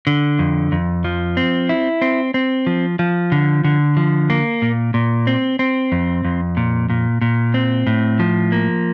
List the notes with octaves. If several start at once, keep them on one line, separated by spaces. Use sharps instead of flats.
D3
F2
F2
F3
C4
E4
C4
C4
F3
F3
D3
D3
F3
A#3
A#2
A#2
C4
C4
F2
F2
A#2
A#2
A#2
C4
A2
F3
A#3